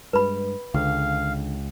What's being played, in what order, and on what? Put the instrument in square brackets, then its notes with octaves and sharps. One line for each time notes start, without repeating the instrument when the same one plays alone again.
[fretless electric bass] G2 G#3 [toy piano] B4 B5
[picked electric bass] C#2 [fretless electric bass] D3 [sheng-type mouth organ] F5